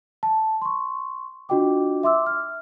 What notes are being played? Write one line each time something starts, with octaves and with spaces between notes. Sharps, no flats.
A5
C6 C#6
D4 F4 F#4 D#5 G5 D6
E5 C6 D6 E6
F6